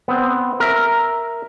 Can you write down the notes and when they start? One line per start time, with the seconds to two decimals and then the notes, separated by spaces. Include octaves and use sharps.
0.08 B3 C4
0.60 A#4 E5